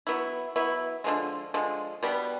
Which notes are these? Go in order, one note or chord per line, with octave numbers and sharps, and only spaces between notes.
F#3 B3 E4
F#3 B3 E4
D3 F3 G#3
D3 F3 G#3
B2 G3 B3